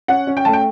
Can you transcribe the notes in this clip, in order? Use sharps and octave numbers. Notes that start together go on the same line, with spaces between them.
C#4 F#5
C#4
G5
A3 A5
G5